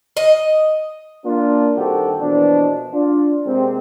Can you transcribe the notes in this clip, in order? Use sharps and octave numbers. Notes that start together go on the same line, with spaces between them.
D#5
A#3 D4 F4
G2 D#3 C4 F#4 G4 A4
B2 E3 F3 A#3 D4
D4 F4
C3 G#3 A#3 C4